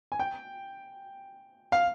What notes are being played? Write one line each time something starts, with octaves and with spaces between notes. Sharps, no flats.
G#5
G5
F5